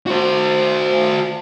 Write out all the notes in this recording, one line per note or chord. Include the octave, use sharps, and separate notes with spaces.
F#4 C5